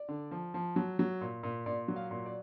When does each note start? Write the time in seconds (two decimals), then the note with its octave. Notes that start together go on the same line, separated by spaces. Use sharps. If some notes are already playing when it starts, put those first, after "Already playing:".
Already playing: D5
0.09 D3
0.31 F3
0.54 F3
0.76 F#3
0.99 F#3
1.21 A#2
1.43 A#2
1.66 A#2 D5
1.88 F#3
1.96 F5
2.11 A#2
2.26 D5